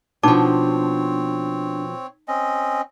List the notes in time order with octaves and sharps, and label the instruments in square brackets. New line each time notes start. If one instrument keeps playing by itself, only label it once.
[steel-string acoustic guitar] B2 F3 [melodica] C4 C#5 [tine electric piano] D4 [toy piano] D#4 A5 D6
[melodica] C4 C#4 D#5